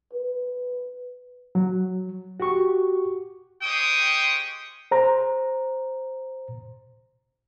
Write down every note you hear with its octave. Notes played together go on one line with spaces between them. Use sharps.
B4
F#3
F#4 G4 C#6
G#3 G4 C5 G5 C#6 D#6
C5 A#5